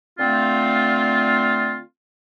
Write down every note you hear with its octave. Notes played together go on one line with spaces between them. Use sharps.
D3 A3 C4 F4